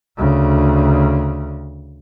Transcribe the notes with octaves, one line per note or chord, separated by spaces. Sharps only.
D2 C#3